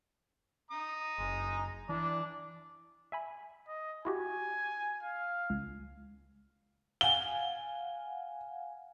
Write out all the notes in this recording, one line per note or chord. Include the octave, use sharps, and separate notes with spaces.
A#5 D#6
F#1 G#3
E3 D4
E5 G#5 B5
D#5
E4 F#4 G4 G#5
F5
C#2
F5 F#5 G#5 G7